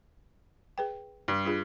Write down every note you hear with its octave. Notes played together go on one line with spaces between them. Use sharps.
G#4 B4 G5
G2
D4 F4 G#4